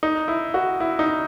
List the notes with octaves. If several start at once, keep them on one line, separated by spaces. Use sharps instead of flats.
D#4
E4
F#4
E4
D#4